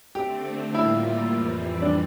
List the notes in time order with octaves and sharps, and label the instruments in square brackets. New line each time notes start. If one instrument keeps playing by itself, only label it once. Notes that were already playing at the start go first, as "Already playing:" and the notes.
[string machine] D3 A3 C4 [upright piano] G4
[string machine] A2 G3 A#3 F4 [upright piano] E4
[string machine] F2 E3 G3 C4
[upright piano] D4